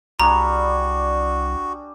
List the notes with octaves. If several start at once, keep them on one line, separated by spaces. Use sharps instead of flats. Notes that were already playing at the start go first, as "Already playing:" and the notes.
C2 G3 D4 F#4 G#4 A#5